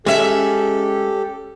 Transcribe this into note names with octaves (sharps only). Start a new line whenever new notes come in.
G#3 C#4 G4 A4 E5